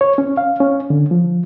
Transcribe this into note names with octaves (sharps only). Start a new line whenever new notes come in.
C#5
C#4
F5
C#4
D3
F3